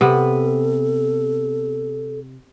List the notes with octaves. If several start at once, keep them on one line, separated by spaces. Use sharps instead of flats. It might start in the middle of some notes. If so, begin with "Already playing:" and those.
C3 B3 A4